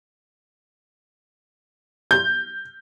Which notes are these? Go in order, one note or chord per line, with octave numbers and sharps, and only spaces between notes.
G6